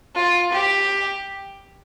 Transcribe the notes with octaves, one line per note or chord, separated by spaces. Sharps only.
F4
G4